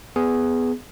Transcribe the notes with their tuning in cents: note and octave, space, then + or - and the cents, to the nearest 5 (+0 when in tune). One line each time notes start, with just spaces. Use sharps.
B3 +10 G#4 +0